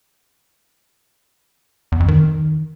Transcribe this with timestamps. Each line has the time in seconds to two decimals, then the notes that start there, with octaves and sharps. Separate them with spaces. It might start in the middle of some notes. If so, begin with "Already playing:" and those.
1.92 E2
2.00 F2
2.08 D#3